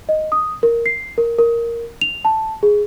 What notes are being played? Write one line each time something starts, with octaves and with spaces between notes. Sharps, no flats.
D#5
D#6
A#4
C7
A#4
A#4
F7
A5
G#4